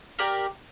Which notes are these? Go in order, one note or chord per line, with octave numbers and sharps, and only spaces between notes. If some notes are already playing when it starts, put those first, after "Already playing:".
G4 A#4 D5 G5